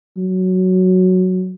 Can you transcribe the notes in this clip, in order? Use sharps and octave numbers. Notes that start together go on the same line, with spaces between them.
F#3